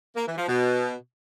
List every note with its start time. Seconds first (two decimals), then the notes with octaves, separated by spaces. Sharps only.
0.16 A#3
0.27 E3
0.38 F3
0.48 B2